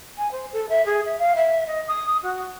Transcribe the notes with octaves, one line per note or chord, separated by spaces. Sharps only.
G#5
C5
A4
E5
G#4
E5
F5
E5
D#5
D#6
F#4